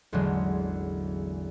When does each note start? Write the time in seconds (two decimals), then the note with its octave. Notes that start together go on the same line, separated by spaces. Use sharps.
0.12 A1 E2 D3 F#3 G#3